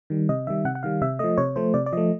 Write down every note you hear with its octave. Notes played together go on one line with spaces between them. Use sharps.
D#3 G3
C3 D#5
D#3 G3 E5
C3 F#5
F#5
D#3 G3 F5
C3 E5
F3 A3 D#5
C3 C#5
F3 A3 C5
C3 D5
D5
F3 A3 D#5